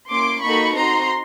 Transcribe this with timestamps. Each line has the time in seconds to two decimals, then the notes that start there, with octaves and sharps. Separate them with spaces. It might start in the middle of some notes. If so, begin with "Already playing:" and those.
0.09 A#3 C#4 E4 C6 D6
0.42 A#3 D#4 F#4 A4 B5 C#6
0.75 C4 D#4 F#4 A#5 C6